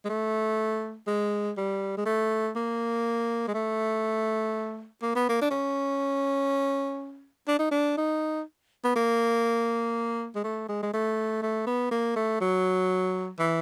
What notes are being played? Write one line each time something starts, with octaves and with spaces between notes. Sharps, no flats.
G#3
A3
G#3
G3
G#3
A3
A#3
G#3
A3
A#3
B3
A#3
D4
C#4
D4
D#4
D4
D#4
B3
A#3
G#3
A3
G#3
G#3
A3
A3
B3
A#3
A3
F#3
E3